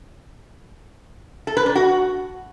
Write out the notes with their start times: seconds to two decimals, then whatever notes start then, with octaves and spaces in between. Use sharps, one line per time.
1.47 A4
1.57 B4
1.66 D4
1.75 F#4